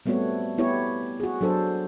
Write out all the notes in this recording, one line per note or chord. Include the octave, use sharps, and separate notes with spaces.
G3 A3 B3 C4 F#4 C#5
B3 E4 G4 C#5
F#4 G#4
F#3 D4 A4 C5